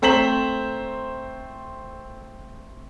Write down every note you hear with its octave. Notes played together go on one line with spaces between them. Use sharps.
A3 C4 C5 A#5 B6 F#7